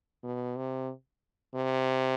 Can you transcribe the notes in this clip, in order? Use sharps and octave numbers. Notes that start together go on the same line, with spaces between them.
B2
C3
C3